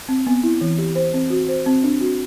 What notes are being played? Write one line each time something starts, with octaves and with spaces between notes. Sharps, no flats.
C4
B3
E4
E3
G4
C5
C4
F#4
C5
C4
D4
F#4